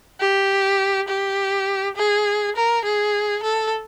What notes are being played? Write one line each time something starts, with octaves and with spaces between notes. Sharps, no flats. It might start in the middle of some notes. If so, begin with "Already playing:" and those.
G4
G4
G#4
A#4
G#4
A4